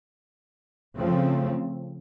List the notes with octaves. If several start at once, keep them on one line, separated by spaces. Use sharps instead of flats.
C#3 F3 A3 C4